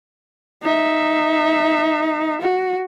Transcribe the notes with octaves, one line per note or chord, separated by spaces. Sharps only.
D#4 E5
F#4